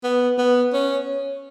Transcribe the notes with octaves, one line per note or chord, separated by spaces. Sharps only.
B3
B3
C#4